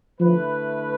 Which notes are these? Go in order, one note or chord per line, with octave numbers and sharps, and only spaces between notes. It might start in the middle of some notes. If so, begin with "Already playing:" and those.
D3 F3 A3 E4 B4